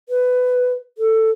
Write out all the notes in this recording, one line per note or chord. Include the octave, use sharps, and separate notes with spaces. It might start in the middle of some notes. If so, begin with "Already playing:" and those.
B4
A4